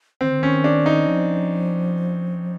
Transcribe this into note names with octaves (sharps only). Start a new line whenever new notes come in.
D#3 C4
D3
D#3 C#4
D4
D#4
F3